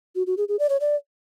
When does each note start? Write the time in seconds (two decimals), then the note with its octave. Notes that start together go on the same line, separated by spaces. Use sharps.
0.15 F#4
0.27 F#4
0.37 G#4
0.48 G#4
0.59 D5
0.69 C#5
0.81 D5